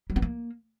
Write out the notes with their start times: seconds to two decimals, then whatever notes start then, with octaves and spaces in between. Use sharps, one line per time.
0.10 G3
0.16 B3
0.22 A#3